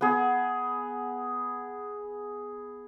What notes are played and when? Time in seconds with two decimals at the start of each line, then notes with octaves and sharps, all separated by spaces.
0.01 B3 G#4